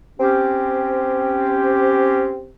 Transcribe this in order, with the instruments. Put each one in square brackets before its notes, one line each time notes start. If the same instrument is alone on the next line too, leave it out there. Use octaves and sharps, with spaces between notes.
[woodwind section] C4 C#4 G4